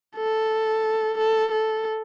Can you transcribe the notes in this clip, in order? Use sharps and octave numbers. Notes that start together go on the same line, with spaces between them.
A4
A4
A4